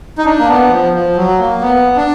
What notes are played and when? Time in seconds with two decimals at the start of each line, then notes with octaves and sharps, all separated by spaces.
0.18 D#4
0.25 D4
0.39 A#3
0.48 B3
0.71 F3
0.93 F3
1.16 F#3
1.39 A#3
1.61 B3
1.96 D4